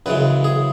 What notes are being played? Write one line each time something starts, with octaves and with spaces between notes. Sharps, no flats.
F#2 C#3 E3 G#3 B4
G#4